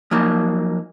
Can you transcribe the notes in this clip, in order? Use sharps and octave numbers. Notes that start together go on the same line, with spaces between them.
F3 F#3 A#3 D#4